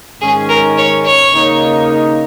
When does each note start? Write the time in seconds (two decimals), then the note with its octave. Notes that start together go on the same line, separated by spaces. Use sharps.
0.21 G#2 D#3 G#3 C#4 G#4
0.49 A#4
0.78 C#5
1.05 C#5
1.34 C#3 A#3 D#4